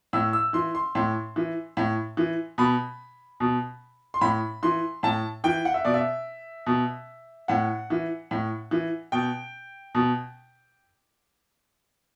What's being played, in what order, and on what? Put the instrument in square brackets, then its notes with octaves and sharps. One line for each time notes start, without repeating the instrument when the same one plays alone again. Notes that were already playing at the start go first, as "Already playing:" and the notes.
[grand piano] A2 E6
E6
E3 C6
C6
A2 C6
E3
A2
E3
B2 B5
B2
C6
A2 B5
E3 C6
A2 A5
E3 G5
F#5
E5
B2 D5
E5
B2
A2 F#5
E3
A2
E3
B2 G5
B2